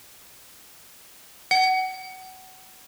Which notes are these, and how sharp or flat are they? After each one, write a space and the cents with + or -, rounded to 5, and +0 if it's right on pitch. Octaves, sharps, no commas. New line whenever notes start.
F#5 +25